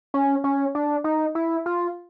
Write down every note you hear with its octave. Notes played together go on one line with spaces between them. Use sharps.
C#4
C#4
D4
D#4
E4
F4